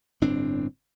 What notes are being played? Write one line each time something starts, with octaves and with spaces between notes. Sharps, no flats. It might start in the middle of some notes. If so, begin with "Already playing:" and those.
G1 A2 C4 D4